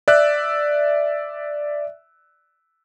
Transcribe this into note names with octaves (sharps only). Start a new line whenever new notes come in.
D5 E5 E6 F#6